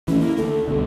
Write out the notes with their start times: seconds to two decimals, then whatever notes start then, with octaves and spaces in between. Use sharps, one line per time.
0.08 E3 F#3 A3 C#4
0.20 A#3 E4
0.37 D2 A4
0.68 C2 B2 D3